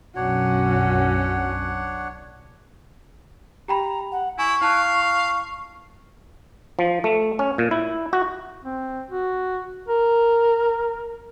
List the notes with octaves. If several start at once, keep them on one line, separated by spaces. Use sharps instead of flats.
B1 F#2 C#4 D4 F#4 C#5 F#5
G4 G5 A#5 B5
F#5
E4 G#5 C#6
E4 F5 A5 F#6
F3
A3
C#4
A#2
E4
F#4
C4
F#4
A#4